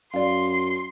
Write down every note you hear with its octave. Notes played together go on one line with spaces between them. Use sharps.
F#2 D5 F5 C6